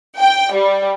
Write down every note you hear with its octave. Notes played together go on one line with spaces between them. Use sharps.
G5
G3